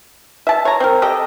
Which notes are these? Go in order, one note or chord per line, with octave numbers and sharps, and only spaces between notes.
E5 A5
C#5 A#5
C4 A#4
G4 A4 D#5